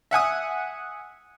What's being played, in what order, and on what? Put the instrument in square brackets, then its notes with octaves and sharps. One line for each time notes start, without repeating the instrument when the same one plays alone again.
[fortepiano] E5 F#5 G#5 D#6